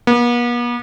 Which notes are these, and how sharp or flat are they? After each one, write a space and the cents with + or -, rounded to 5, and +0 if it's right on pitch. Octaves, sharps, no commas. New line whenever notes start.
B3 -45